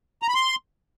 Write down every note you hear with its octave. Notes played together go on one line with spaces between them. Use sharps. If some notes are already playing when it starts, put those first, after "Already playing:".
A#5
B5
C6